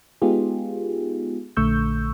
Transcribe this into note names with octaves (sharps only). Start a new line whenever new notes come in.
G#3 B3 D#4 F4 G4 G#4
A#1 D3 A3 C#6 E6 G6